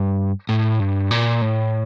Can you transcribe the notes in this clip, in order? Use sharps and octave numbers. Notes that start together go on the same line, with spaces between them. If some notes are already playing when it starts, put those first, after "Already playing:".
Already playing: G2
A2
G2
A#2
A2